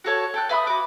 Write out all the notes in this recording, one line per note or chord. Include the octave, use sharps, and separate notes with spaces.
F#4 A4 C#5 A5
A4 G5 F#6
B4 E5 B5 D#6
F#4 D6